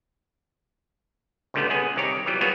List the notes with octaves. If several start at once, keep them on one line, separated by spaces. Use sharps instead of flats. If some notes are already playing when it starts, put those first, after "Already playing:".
C#2 A#2 D3 G3 A3 B3
B3 C#4 G#4
C2 D#3 G4 C#5 A#5
E3 F#3 G3 B3
F#3 A#3 B3 G#4 C#5